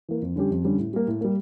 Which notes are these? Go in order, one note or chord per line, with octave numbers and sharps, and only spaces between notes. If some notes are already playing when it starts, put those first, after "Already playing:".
E3 A#3
F2
D3 G3 C#4 G4
F2
D3 G3 C#4 G4
A2
G3 A#3
A2
G3 A#3